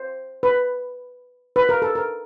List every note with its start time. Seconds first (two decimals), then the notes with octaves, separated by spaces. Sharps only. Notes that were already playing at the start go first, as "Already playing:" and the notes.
Already playing: C5
0.43 B4
1.56 B4
1.69 A#4
1.82 A4
1.95 A#4